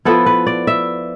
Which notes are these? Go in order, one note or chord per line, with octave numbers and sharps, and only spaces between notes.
F3 B3 E4 A4
B4
D5
E5